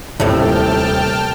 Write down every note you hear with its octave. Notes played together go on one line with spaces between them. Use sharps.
D#1 A2 C3 G5 A5 F6